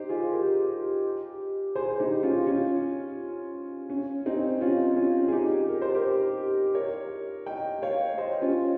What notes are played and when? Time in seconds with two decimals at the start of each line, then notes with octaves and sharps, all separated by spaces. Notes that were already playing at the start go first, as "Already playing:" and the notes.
Already playing: D#4 G4 C5
0.09 F4 G#4
0.33 G4 A#4
1.75 G#4 C5
1.99 D#4 G4
2.23 C#4 F4
2.47 C#4 F4
3.90 C#4
4.26 C4 D#4
4.61 C#4 F4
4.96 C#4 F4
5.28 G#4
5.32 D#4 G4
5.69 A#4
5.82 C5
5.94 G4 A#4
6.75 A#4 C#5
7.46 D#5 G5
7.82 C#5 F5
8.18 C5 D#5
8.42 C#4 F4